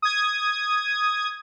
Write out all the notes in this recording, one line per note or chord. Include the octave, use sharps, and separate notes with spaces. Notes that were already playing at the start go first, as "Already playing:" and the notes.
D#6 G#6